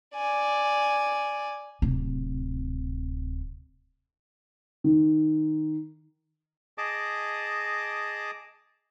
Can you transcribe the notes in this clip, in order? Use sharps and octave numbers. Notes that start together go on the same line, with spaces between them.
D5 G#5
D1 C3
D#3
G#4 D#5 A5 D6